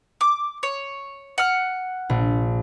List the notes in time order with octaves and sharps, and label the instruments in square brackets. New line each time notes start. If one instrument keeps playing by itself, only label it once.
[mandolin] D6
C#5
F#5 F6
[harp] A#1